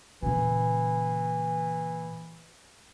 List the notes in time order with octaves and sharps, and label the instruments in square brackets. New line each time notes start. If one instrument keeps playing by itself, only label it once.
[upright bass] A#2 C#3 [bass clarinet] E3